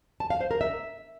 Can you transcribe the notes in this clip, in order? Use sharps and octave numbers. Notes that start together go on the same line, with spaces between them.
A5
F5
C5
A#4
E5